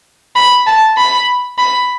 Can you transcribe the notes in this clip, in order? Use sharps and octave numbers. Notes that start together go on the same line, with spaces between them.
B5
A5
B5
B5